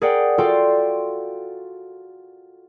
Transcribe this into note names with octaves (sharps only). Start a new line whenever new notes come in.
G#4 A#4 D5 F#5 G5
F4 F#4 A4 D5 G5 C6